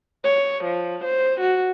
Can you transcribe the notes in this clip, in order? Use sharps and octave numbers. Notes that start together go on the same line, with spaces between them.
C#5
F3
C5
F#4